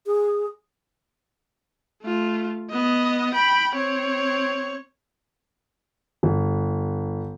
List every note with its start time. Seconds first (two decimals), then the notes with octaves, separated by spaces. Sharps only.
0.07 G#4
2.02 A3 F4
2.71 B3 D#5
3.34 G5 B5
3.75 C4 C#5
6.23 G1